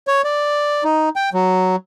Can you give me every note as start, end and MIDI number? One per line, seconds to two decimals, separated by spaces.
0.07 0.22 73
0.24 0.84 74
0.84 1.09 63
1.16 1.30 79
1.33 1.76 54